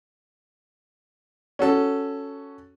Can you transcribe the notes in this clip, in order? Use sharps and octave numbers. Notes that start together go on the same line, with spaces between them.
C#4 F#4 A4